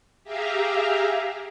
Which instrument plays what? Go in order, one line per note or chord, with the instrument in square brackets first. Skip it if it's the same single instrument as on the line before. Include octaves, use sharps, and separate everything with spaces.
[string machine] G4 G#4 E5 F5 A#5